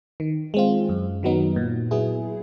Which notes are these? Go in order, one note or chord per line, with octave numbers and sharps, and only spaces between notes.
D#3
G#3 C4 F4
F#2
D#3 F#3 B3 D#4
A#2
F#3 B3 E4 G#4